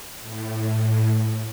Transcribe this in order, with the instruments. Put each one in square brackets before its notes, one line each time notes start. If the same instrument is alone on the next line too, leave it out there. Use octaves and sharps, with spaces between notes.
[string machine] A2